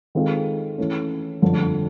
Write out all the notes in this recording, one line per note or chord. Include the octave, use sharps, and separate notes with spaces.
D#3 G#3 C4 F4 A4
E3 A3 C#4
G1 F2 D3 F3 A3